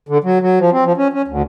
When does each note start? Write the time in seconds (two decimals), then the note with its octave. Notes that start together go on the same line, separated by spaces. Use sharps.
0.09 D3
0.24 F#3
0.41 F#3
0.60 F3
0.72 C4
0.85 F3
0.97 C#4
1.13 C#4
1.28 D2